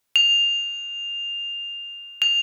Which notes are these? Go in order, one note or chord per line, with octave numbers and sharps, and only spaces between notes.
F7
F7